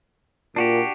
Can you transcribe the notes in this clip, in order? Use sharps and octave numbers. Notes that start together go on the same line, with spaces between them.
A#2 D4 F#4 G4